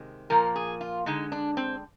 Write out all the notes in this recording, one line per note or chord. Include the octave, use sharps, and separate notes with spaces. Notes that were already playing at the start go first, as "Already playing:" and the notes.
Already playing: C3 D#3 G#3
A#2 F3 A#3 A#4
G#4
F4
D3 G#3 D#4
D4
C4